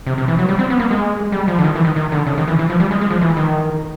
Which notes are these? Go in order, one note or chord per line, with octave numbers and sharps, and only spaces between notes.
C3
C3
E3
F#3
G3
C4
B3
A#3
G#3
G3
F3
D3
D#3
E3
D#3
D#3
D3
C#3
D#3
E3
E3
F3
G3
G#3
G#3
F3
E3
D#3